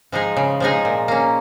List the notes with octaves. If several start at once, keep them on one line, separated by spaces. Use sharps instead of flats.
F3 G#3 D#4 G#4
C#3
F3 G#3 D#4 G#4
A#2
A#3 C#4